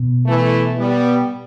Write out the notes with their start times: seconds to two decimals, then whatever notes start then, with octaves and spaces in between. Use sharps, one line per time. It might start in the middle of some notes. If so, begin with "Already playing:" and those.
Already playing: B2
0.26 E3 A3
0.78 G3 B3